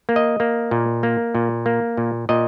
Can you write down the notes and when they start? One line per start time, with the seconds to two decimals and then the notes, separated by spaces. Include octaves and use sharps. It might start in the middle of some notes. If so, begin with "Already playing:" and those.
0.09 A#3
0.16 D#5
0.40 A#3
0.71 A#2
1.03 A#3
1.35 A#2
1.66 A#3
1.97 A#2
2.29 A#2 D#5